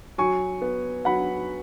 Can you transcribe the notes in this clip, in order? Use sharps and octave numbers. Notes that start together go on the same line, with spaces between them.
F#3 G#5 C#6
B3
F#3 F#5 B5